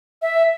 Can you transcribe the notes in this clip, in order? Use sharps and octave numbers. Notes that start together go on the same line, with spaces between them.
E5